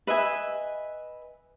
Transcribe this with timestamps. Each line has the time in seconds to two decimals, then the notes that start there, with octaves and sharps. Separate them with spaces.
0.07 B4 D#5 E5 G#5